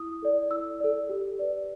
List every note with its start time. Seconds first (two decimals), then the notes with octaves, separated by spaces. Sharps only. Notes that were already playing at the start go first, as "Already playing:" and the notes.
Already playing: E4 D#6
0.22 A4 D5
0.51 E4 E6
0.80 A4 D5
1.09 G4
1.39 B4 D5